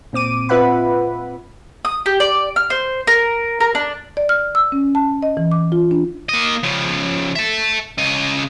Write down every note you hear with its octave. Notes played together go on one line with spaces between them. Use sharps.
A#2 C4 D6 D#7
C4 F4 B4 E5 F#5 B5
D#6
G4
D5
F6
C5
A#4
A#4
D4
D5
F6
E6
C#4
A5
D#5
E3
D6
F4
D4
A#3 D#5
C#3 F3
E5 A5
C#3 D#5